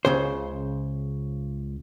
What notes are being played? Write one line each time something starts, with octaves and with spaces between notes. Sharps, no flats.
C#2 C#3 C5